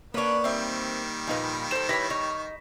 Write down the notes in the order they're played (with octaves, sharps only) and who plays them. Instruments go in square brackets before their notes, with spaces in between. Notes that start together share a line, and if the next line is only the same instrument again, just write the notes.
[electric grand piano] A#3 [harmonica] B3 [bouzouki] C#4 D4 [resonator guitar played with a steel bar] B4 C#5
[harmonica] D#3 G3 [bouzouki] C4 E5
[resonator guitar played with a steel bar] A#2 D#4 G#5 [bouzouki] F3 B4
[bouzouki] G#4 A4 [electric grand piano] C5 E7
[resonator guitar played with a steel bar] E4 G4 [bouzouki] B4 C#5 [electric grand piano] A#6 B6
[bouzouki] D#4 [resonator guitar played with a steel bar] C#5